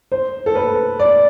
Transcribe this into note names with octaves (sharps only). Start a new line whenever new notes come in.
C5
A4
B4
D5